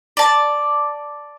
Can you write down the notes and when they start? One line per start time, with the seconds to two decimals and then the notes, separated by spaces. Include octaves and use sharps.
0.17 D5 A5